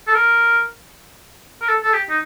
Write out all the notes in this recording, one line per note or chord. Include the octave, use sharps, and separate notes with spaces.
A4
A#4
A#4
A4
A4
G4
D#4